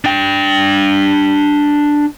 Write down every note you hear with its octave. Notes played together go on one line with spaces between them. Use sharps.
D4 G5